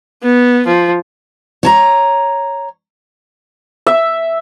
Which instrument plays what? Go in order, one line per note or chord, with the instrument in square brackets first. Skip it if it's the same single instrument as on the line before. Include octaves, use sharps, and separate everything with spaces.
[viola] B3
F3
[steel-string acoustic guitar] C#5 A5 A#5
[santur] E5